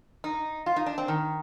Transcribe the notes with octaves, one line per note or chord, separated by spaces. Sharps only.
D#4
F4
D#4
D4
C4
D#3